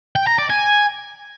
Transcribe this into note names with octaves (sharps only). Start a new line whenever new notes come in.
G5
A#5
D5
G#5